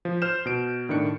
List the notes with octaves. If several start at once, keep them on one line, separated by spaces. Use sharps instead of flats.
F3
C5 F6 G6 E7
B2 D7
A2 D#3 D4 C#7